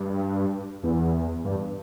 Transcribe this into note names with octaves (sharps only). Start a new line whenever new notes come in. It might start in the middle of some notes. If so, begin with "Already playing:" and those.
Already playing: G2
E2
G2